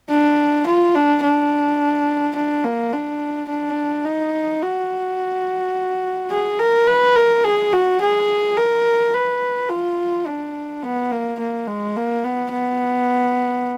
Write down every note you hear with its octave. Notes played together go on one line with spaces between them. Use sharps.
D4
F4
D4
D4
D4
A#3
D4
D4
D#4
F#4
G#4
A#4
B4
A#4
G#4
F#4
G#4
A#4
B4
F4
D4
B3
A#3
A#3
G#3
A#3
B3
B3